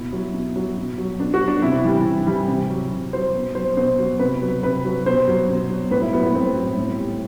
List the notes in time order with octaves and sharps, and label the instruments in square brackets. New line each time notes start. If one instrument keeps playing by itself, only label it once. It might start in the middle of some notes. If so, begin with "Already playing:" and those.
Already playing: [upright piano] B2 E4
F#3
B2
F#3
B2
F#3
B2 D4
F#4
F#3
D4
C3 E4
E3 G3
C3
E3 G3
C3
F#3
C3
F#3 C5
B2
F#3 C5
B2 C5
F#3
C3 B4
F#3
C3 B4
F#3
B2 C5
F#3
B2
F#3
A2 B4
E4
F#3 B3
B3
A2 C4
F#3
A2
G3